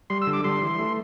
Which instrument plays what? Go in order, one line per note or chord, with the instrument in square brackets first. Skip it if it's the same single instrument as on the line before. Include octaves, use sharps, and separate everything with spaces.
[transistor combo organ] G3 C6
E6
D3
D6
G3 C6
E3
A3